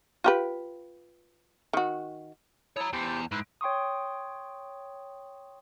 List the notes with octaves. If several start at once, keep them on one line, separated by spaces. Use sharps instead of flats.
F4 G4 B4
D#3 F#4
E4 C#5 A5 A#5 D#6
E2 G4 C5 A5
G#2 E4 B4 C6
C#5 G5 C6 C#6 D#6